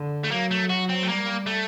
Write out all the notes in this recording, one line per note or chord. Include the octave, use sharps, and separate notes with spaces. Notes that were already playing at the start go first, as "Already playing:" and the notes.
Already playing: D3
A3
F#3 A#3
A3
F#4
C4
A3
G3 A#3
A3